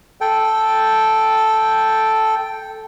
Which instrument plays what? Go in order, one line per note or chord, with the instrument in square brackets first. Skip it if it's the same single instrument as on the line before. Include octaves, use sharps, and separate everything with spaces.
[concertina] A4 G5